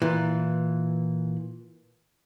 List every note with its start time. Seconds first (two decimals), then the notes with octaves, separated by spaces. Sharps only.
0.02 A#2 E3